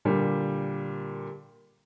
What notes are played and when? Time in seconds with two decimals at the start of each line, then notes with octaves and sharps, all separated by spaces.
0.05 A#2 D3 G3